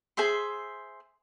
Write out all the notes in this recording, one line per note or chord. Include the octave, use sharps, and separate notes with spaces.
G#4 C5 E5 C6